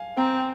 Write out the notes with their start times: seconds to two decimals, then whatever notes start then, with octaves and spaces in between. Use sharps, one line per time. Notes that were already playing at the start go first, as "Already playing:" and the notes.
Already playing: F5 G#5
0.17 C4 G5 A#5